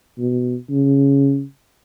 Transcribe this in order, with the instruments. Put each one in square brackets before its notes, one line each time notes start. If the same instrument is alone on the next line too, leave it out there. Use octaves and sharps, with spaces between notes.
[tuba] B2
C#3